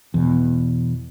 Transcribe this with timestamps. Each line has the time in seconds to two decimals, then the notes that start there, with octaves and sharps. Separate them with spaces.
0.14 E2 B2